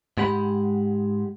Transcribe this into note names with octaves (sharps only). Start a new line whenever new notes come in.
G#2 G#3 G4 F#5 B5